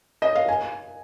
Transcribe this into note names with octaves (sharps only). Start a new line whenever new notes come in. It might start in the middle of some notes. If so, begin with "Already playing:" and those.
D#5
F5
G#5